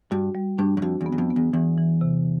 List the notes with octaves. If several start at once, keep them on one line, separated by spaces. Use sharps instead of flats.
G2 F#4
G3
G2 D4
F#2
F2 F#4
E2
B3
E2
F2
B3
E2
E2 E3
E3
C3